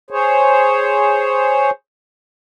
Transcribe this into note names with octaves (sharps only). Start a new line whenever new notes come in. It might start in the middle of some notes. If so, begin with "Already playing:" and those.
G#4 C5 C#5